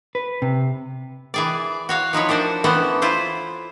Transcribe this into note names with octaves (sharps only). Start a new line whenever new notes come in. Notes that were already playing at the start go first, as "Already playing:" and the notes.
B4
C3
E3 G#4 D5
F#4 C#5 F5
F3 D#4 E4 C#5
D4 A#4 C5 D5
E3 B3 C#4 A4 C5
E4 F4 C5